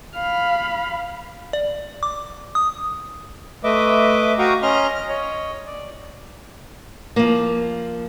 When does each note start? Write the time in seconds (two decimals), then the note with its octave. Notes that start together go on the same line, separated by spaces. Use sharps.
0.15 F5 B5
1.53 D5
2.03 D6
2.55 D#6
3.64 A3 B4 D#5 E5 D6
4.39 F#4 F5 G5 A#5 C#6 D#6
4.62 C#4 D#5 A#5 C6 F6
4.94 F6
5.09 C#5 D#5
5.66 D5
7.16 F3 A#3